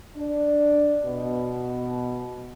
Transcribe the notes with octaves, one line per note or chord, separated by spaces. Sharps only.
D4
B2